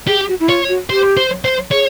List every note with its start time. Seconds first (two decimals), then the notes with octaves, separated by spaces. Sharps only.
0.08 G4 G#4
0.28 F#4
0.40 E4
0.48 F4 C#5
0.69 F#4
0.90 G4 C5
1.17 C5
1.45 C5
1.71 G#4 C#5